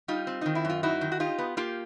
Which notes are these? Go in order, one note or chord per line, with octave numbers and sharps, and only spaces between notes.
G3 D#4 F4
C4
D#3 D#4
E4
F#2 F4
D#4 E4 F#4
D#3
F#4
D#4 F4 G4
B3
A#3 F4 G4